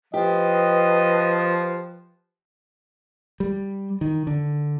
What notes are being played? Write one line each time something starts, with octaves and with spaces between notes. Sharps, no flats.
F3 G4 B4 D#5
G3
D#3
D3